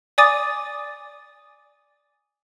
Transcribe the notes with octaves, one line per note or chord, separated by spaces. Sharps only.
D5 G#5 D6 D#6 A6 D#7